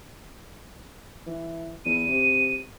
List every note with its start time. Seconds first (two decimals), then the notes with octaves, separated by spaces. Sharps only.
1.27 E3
1.85 E2 D#7
2.08 C3